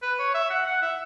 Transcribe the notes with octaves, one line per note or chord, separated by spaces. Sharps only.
B4
C#5
E5
F#5
F#5
E5